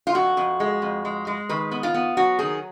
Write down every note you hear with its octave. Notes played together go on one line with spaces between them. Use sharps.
F4
F2 F#4
F2
G#3
F2
G#3
G#3
D#3 B4
B3
F4
B3
F#3 F#4
D#3 G#4